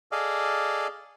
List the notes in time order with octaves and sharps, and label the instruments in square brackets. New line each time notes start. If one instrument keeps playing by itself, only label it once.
[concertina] G#4 A4 D5 D#5 F5